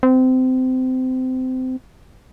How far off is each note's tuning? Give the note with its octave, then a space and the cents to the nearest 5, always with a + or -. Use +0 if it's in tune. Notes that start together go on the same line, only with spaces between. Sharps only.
C4 -25